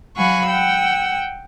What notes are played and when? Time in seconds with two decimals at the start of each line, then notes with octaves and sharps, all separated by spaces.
0.17 F#3 F5 F#5 G#5 B5 C#6
0.48 F#5 G5 E6